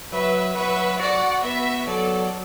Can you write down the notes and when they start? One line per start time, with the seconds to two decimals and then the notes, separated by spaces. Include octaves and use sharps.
0.11 F#3 B4 E5
0.55 F#4 B4 E5
0.99 F#4 D5 F#5
1.43 B3 B4 E5
1.87 F#3 A4 D5